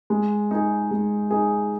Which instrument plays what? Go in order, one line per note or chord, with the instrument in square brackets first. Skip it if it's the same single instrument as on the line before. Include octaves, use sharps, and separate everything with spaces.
[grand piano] G#3
D#4 G#4
G#3
D#4 G#4